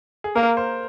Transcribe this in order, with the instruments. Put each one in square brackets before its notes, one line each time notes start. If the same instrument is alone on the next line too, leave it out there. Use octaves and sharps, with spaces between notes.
[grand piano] G#4
[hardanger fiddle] A#3 [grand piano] A#4
[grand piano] C5